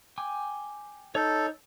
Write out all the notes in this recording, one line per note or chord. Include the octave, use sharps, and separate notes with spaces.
G5 G#5 D6
D#4 A4 C#5 G6